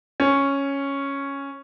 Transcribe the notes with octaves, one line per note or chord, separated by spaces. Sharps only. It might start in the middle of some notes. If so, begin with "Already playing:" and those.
C#4